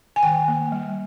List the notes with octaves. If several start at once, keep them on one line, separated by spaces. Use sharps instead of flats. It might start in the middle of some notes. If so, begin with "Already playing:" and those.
G#5
D#3 G5
A#3
G3